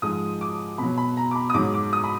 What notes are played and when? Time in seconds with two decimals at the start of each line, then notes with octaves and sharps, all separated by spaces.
0.02 G#2 F3 G#3 D#6
0.41 D6
0.78 B2 F#3 B5
0.98 B5
1.17 A#5
1.31 D6
1.36 B5
1.50 D#6
1.54 G#2 F#3 D6
1.74 D6
1.93 D#6
2.04 B5